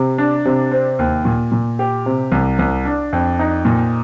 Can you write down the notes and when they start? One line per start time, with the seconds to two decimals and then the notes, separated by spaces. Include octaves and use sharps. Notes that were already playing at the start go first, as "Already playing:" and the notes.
Already playing: C3
0.18 D4
0.45 C3
0.71 C4
0.99 D#2
1.25 A#2
1.52 A#2
1.79 G4
2.06 C3
2.32 C2
2.59 C2
2.85 D4
3.13 F2
3.39 D#4
3.65 A#2